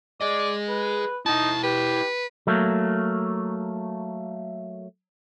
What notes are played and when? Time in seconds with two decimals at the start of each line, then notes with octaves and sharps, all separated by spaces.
0.21 G#4 D5 D#5
0.69 B4
1.26 D#4 E4 G5 A5
1.63 G4 B4
2.47 F#3 A3 A#3